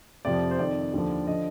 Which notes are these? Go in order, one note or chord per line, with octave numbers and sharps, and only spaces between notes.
F2 C3 F3 D5
C5
F2 D#3 D5
D#2 D3 F3
D3 F3 D#5